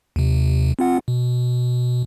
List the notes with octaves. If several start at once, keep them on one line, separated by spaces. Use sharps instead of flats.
D#2 C3
C4 F4 F#5
B2